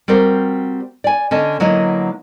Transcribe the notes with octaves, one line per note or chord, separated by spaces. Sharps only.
G3 C4 F#4 A#4 C5
D5 G#5
D3 C#4 D#5 A5
D3 F#3 A#3 B3 E4 D#5